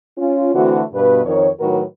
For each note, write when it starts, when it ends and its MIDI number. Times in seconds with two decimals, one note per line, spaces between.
0.18 0.53 61
0.18 0.53 65
0.54 0.81 50
0.54 0.81 52
0.54 0.81 57
0.54 0.81 60
0.54 0.81 66
0.93 1.22 43
0.93 1.22 47
0.93 1.22 71
1.25 1.49 41
1.25 1.49 51
1.25 1.49 70
1.25 1.49 73
1.61 1.82 45
1.61 1.82 51
1.61 1.82 54
1.61 1.82 66
1.61 1.82 70
1.61 1.82 71